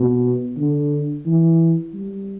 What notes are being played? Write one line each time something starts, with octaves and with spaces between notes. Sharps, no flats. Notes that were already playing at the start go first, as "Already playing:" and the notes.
Already playing: B2
D3
E3
G3